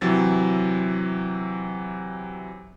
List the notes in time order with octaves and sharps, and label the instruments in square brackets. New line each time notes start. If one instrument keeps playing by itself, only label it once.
[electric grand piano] C3 E3 F#3 C4 A6